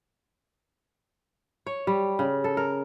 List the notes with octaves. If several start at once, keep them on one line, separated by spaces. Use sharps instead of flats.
C#5
G3
C#3
A4
A#4